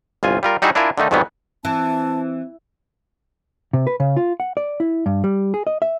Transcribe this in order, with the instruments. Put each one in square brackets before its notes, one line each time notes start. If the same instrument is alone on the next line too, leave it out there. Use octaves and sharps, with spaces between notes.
[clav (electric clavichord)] G1 C2 F4 G#5
G3 F4 A#4
G3 D#4 E4 F#4 G#4 E5
D4 E4 F4 A#4 G#5
D3 D#3 A3 D#4
F2 G#2 D#3 F#3 G3 B3
[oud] E3 [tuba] C4 [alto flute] A5
[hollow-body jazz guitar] C3
B4
C#3
F4
F#5
D5
E4
G2
G3
G#4
D#5
E5